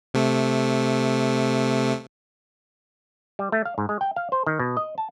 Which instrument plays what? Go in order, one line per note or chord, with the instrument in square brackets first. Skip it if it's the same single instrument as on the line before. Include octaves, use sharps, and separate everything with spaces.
[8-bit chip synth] C3 A3
[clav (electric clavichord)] G3
A3
F5
G#2
G#3
G5
F5
C5
D#3
B2
D#5
A5